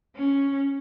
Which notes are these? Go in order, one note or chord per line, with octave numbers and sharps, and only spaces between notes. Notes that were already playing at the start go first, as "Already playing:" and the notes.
C#4